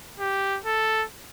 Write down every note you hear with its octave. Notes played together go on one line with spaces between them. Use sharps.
G4
A4